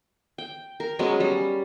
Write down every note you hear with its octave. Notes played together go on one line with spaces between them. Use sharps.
G5
A#4
F#3 G#3 B3 C#4
G3